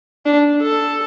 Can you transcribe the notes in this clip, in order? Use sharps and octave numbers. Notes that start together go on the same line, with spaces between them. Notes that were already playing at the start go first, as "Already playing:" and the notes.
D4
A4